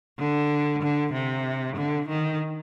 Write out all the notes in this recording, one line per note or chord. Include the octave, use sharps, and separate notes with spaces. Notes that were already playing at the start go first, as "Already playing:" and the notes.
D3
D3
C3
D3
D#3